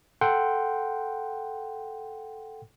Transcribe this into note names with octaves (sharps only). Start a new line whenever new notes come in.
A4 F#5 G5 C6